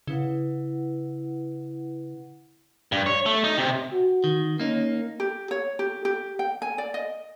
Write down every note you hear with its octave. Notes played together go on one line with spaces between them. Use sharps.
C#3 E4 B4 F#5
G2
C#5
A3
D#4
C3
F#4
D#3
A#3 C#4 D#4
G4
C#5
G4
G4
G5
G#5
D5
D#5